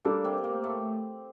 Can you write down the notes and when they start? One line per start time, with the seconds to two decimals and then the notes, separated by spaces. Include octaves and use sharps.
0.05 A#2 G3 A#3 D4 A4
0.24 C3 C4
0.44 A#2 A#3
0.64 A2 A3